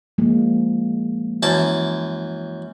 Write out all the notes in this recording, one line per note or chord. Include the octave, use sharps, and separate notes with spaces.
F3 G#3 A#3
F#2 E3 A5